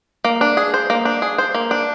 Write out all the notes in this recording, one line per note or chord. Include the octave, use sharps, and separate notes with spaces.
A#3
D4
G#4
C5
A#3
D4
G#4
C5
A#3
D4